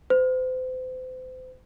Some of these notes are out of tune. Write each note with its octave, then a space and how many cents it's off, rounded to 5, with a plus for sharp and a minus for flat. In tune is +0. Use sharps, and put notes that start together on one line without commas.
C5 -35